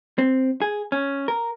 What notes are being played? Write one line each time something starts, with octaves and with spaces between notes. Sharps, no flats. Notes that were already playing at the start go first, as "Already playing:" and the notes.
C4
G#4
C#4
A#4